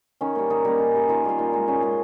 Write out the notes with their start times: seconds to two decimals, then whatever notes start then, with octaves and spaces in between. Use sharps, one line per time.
0.21 D#3 C#4
0.35 G3 A#3
0.50 D#3 D#4
0.65 G3 A#3 C#4
0.79 D#3
0.94 G3 A#3
1.09 D#3 F4
1.24 G3 A#3 F4
1.38 A#2 D#4
1.53 G#3
1.68 A#2 C#4
1.83 G#3